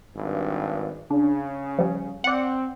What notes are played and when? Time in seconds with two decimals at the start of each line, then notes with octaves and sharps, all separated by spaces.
0.15 G#1 G2
1.11 C#3 D4
1.79 F3 G3
2.24 C4 D5 F#5